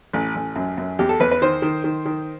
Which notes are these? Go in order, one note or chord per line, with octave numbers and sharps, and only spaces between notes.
A1
A1
F#2
F#2
E2 G4
A4
E2 B4
B4
D#3 C5
D#3
D#3
D#3